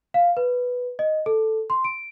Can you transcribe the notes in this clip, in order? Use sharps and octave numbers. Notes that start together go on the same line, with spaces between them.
F5
B4
D#5
A4
C6
D7